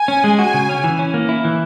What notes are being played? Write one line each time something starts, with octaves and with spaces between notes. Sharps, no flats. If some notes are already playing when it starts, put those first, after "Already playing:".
Already playing: G#5
C#4
G#3
F#4 G#5
C#3
C#4
E3
C#4
A#3
E4
E3